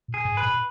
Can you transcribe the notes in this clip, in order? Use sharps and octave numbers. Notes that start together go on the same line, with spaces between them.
A#2
G#4
G#2
B4
A#2